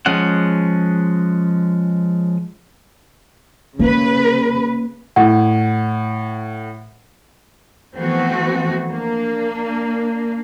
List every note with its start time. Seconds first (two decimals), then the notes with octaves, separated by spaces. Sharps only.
0.06 F3 G#3 C#4 F#5
3.79 C#3 A#3 B4
5.16 A2 F#5
7.97 E3 F3 A3 B3 C4 F#4
8.89 A#3 D4